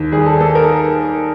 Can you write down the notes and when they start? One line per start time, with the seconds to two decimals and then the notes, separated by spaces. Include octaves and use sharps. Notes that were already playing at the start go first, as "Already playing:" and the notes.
Already playing: D#2
0.12 G3 G#4
0.26 A4
0.40 A#3 A4
0.55 A#4